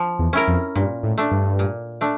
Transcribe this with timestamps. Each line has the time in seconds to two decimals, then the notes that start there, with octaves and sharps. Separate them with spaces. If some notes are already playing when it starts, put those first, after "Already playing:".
Already playing: F3
0.19 E2
0.33 C#4 E4 A#4
0.48 F2
0.75 G2 A#2
1.03 A2
1.18 A3 D4
1.31 G2
1.59 A#2
2.01 A3 D4